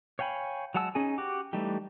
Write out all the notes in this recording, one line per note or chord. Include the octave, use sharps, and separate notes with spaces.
C#5 F5 G5 G#5 B5
F#3 G#3 F#5 A5 E6
C#4 D#4 G#4 G#5
F#4 G4 D6
E3 G3 A3 D#4 G4